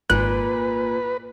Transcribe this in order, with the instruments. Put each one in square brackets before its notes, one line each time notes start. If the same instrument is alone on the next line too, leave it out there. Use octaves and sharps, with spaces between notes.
[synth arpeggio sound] G#1 F#6 [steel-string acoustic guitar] A#2 [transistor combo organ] B4